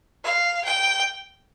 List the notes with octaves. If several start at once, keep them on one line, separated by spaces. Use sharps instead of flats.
F5
G5